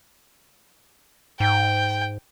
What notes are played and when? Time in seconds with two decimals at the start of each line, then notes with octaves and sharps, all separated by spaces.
1.40 G#2 G5